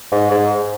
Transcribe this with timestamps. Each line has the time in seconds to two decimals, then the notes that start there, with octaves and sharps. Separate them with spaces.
0.12 G#2
0.31 G#2